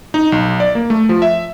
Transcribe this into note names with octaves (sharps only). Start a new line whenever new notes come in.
D#4
B1
D5
A#3
A3
F3
E5